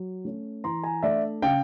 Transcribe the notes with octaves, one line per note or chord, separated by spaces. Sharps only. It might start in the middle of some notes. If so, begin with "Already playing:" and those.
Already playing: F#3
A3 C#4
E3 A#5 C6
G#5 A#5
A3 D4 D5 E5
C#3 F5 G5